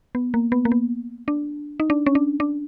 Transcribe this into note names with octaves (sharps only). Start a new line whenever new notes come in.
B3
A#3
B3
A#3
B3
D4
D#4
D4
C#4
D4
D4